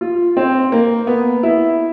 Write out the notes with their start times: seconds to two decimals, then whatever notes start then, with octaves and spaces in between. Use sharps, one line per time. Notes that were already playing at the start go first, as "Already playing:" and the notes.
0.01 F4
0.37 C4
0.72 A#3
1.07 B3
1.43 E4